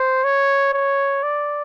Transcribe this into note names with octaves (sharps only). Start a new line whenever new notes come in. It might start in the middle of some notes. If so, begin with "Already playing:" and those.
Already playing: C5
C#5
C#5
D5